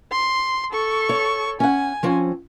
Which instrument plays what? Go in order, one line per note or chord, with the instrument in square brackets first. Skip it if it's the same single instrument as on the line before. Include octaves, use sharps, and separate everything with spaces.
[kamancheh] C6
A4 C#6
[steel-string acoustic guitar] C#5
[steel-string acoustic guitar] C#4 F#5 [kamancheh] G#5
[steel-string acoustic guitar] F3 C4 C#4